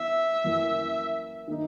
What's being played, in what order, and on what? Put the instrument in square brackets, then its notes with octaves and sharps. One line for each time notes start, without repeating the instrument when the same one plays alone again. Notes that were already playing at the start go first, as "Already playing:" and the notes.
Already playing: [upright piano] E3 B3 [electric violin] E5
[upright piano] F#2 E3 A#3 E4
D#3 A#3 D#4